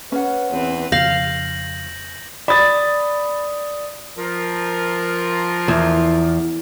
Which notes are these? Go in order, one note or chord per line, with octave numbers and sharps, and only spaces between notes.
C#4 B4 F#5
E2 C4 B4
F2 C#3 F5 G6 A#6 F#7
D5 B5 D#6 A6
F3 F4 A#4
E2